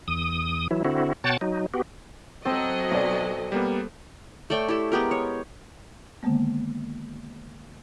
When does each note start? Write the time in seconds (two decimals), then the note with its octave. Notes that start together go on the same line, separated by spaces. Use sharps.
0.08 E2 D#6
0.71 E3 F#3 E4
0.85 D3 C4 E4 F#4
1.24 B2 C#5 F#5 G5 A5 A6
1.41 F#3 D#4
1.74 B3 F#4 G4
2.45 F#3 C4 A4 C5 D#5
2.91 B1 D5
3.52 G3 A#3 B3
4.50 A3 C#5 D5 G5
4.68 E4 G4 A4
4.92 G#3 B3 G4 A#4
5.11 C#5
6.23 D3 D#3 G#3 A#3 B3